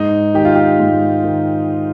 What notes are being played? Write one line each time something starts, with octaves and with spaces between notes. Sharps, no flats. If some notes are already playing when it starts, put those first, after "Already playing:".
Already playing: G#2 D#4
D#3 G4
F4
G4
G#2
D#3